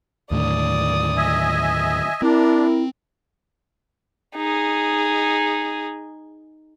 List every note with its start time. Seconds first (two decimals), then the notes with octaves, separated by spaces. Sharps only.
0.31 D#2 A2 D3 D5 D#6
1.17 D#5 E5 G#5
2.22 C4 D4 E4 A#4
4.35 D#4 G#4